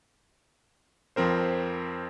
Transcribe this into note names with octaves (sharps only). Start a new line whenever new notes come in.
F2 F3 C4 A#4 C5